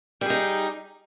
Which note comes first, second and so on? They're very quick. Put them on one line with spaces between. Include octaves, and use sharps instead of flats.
G3 G#4 D#4